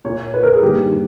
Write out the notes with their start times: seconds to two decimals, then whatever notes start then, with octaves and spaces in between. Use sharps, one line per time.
0.04 A#2 A#3 C#5
0.34 A#2 A#3 B4
0.43 A#4
0.53 G#4
0.62 G2 D#3 A#3 G4
0.92 D#3